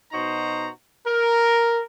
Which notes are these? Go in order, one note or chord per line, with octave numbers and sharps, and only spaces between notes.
B2 D#4 F#4 C5 A#5
A#4